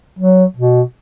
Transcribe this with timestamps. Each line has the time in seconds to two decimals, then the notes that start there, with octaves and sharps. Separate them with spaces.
0.19 F#3
0.56 B2